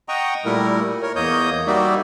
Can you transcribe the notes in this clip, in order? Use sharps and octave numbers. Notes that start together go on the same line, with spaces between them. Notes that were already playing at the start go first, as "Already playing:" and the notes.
D#5 F#5 G5 A#5 C#6 D#6
A#2 G3 A3 E4 A#4
A#4 C#5
E2 A#3 C#5 D#5 D#6 G6
G3 A#3 D#4 F#4 D5 E5